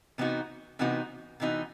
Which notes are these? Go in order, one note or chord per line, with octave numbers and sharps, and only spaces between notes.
C3 E3 B3 D#4 F#4
C3 E3 B3 D#4 F#4
C3 E3 B3 D#4 F#4